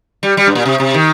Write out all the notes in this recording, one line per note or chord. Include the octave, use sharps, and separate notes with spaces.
G3
G3
G2
A#2
C3
C3
D#3